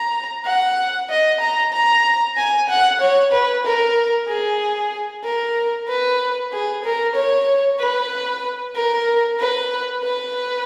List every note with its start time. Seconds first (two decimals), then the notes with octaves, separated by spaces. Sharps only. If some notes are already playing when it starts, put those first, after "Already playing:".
Already playing: A#5
0.45 F#5
1.09 D#5
1.41 A#5
1.73 A#5
2.37 G#5
2.69 F#5
3.01 C#5
3.32 B4
3.65 A#4
4.28 G#4
5.24 A#4
5.89 B4
6.52 G#4
6.84 A#4
7.15 C#5
7.80 B4
8.76 A#4
9.39 B4
10.04 B4